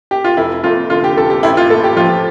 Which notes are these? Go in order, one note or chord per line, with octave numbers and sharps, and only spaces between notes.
G4
F4
F1 E4
F2 F4
D3 F4
G4
F1 A4
G4
A1 E4
F4
A2 A4
G4
F3 F4